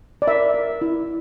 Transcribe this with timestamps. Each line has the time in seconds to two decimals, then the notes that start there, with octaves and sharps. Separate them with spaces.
0.22 D5
0.27 A#4 E5
0.54 A#4
0.82 E4